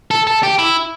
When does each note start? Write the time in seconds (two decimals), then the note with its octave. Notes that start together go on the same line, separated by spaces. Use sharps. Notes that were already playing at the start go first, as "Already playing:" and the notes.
0.11 A4
0.27 A4
0.43 G4
0.59 E4